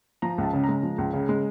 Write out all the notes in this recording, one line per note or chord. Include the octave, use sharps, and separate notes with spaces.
F3 A#5
C#2
A5
C#3
G#3 A#5
F3
C#2
C#3
G#3